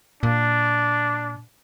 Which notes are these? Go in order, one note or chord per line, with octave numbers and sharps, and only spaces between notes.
A#2 D4